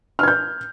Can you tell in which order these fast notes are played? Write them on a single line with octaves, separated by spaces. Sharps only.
F6 G#6 G6